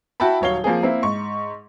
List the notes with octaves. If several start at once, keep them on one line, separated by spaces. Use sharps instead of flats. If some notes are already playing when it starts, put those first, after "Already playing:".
E4 F#4 E5 G5 A5 B5
D#1 F#3 C#5 F5 G7
F3 A#3 C4 G#4
A#3 C4 E4
G#2 C#6